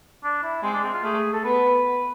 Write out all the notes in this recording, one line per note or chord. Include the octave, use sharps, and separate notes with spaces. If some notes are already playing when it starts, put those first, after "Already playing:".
D4
E4
G#3 C4
D4
C4
F4
A3 G#4
A4
B3 B4